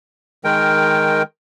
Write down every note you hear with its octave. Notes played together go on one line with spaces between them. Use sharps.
D#3 G#3 A#4 G5